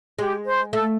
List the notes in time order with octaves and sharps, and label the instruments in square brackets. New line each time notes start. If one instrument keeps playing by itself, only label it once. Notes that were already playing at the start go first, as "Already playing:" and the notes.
[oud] G#3 [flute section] G4
[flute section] C5
[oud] A3 [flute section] A4